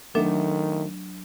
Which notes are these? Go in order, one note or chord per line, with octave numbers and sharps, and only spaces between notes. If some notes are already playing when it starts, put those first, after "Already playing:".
D#3 F#3 A3 D4